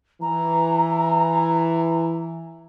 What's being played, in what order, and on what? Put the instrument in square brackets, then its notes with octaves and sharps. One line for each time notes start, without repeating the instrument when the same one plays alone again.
[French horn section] E3 [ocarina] A#5